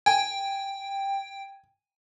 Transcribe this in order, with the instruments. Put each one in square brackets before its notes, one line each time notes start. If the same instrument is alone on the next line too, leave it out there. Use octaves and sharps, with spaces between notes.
[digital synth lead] G5 [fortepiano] G#5